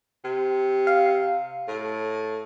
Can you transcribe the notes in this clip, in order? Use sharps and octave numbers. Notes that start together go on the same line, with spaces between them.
C3
F5
A2